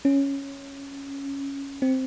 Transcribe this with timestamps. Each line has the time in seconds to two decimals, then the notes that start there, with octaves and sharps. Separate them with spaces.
0.05 C#4
1.82 C4